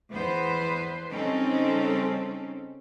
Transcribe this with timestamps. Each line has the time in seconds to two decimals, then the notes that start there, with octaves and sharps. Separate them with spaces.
0.11 E2 B3 B4 C5
1.11 C#3 G3 C4 C#4 D#4 A4